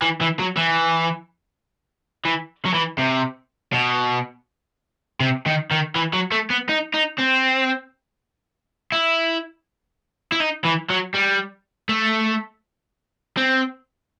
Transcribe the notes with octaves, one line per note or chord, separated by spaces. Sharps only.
E3
E3
F#3
E3
E3
F#3
E3
C3
B2
C3
D#3
D#3
E3
F#3
A3
B3
D#4
D#4
C4
E4
E4
D#4
E3
F#3
G3
A3
C4